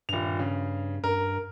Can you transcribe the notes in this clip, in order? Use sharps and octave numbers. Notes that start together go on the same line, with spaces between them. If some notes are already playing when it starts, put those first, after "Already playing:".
D#1 G2 F7
C#3
G2 A#4